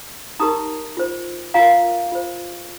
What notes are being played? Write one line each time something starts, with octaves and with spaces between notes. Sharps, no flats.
D#4 G4 A#4 A#5 D#6
F4 C5
F4 A#4 F5 A#5
F4 C5